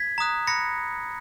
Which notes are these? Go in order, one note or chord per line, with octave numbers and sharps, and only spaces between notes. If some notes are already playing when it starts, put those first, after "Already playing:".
Already playing: G#6 B6
A#5 D#6 F#6
B5 F#6 A#6 C#7